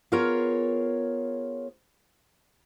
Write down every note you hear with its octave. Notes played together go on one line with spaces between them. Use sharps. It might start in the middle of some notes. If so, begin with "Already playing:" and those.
B3 F4 G#4 A#4 C#5